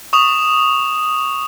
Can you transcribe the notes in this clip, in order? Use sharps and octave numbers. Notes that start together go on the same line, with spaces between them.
C#6 D#6 E7 F7